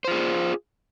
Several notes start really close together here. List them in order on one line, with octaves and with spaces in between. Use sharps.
C5 F4 G#4